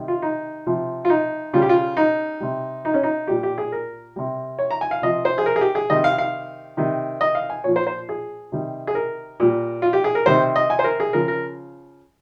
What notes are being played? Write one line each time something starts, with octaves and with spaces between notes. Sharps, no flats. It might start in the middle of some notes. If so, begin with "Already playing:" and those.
Already playing: C3 D#3 G3
F4
D#4
C3 F3
F4
D#4
C#3 G3 F4
G4
F4
D#4
C3 G3
D#4
C#4
D#4
A#2 G3 G4
G4
G#4
A#4
C3 G3
C#5
A#5
G#5
F5
C3 F3 D#5
C5
G#4
A#4
G#4
G4
G#4
C3 D#3 G3 D#5
F5
F5
C3 D#3 G3
D#5
F5
G#5
A#2 F3 C#5
C5
C5
G#4
C3 D#3 G3
G#4
A#4
A#2 G3
F4
G4
G#4
A#4
C3 D#3 G3 C5
D#5
G#5
C5
A#4
G#4
C#3 F3 A#4
A#4